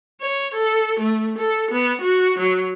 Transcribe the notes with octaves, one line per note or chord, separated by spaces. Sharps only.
C#5
A4
A3
A4
B3
F#4
F#3